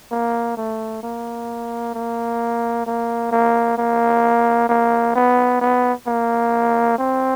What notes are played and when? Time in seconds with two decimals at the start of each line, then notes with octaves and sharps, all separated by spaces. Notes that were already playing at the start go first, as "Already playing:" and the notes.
0.11 A#3
0.57 A3
1.03 A#3
1.94 A#3
2.86 A#3
3.32 A#3
3.78 A#3
4.69 A#3
5.15 B3
5.61 B3
6.07 A#3
6.98 C4